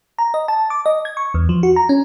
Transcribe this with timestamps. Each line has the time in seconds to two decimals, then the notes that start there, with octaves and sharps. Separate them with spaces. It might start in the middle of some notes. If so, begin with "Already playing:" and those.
0.19 A#5
0.34 D#5
0.48 A5
0.70 D6
0.86 D#5
1.05 G#6
1.17 C#6
1.34 E2
1.49 F3
1.63 F#4
1.76 A#5
1.89 C#4